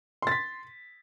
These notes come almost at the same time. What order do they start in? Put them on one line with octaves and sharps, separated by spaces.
C6 A6 B6